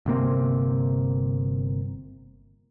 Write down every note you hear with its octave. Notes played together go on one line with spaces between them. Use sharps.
G1 C3 A#3 C4